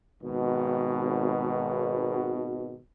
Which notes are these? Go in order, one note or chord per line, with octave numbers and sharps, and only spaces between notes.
G#1 B2